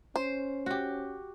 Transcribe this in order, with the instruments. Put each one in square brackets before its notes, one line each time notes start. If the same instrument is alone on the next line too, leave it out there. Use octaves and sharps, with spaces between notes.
[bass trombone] C#4 [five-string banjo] C5
[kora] F#4 G4